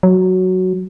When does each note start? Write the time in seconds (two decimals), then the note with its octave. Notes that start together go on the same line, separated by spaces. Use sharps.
0.03 F#3